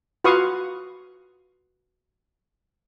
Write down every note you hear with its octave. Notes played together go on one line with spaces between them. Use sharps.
F4 F#4 B4 F5 C#6 D#6